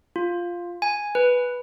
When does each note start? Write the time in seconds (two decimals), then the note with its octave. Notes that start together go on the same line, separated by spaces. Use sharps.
0.16 F4
0.82 G#5
1.15 B4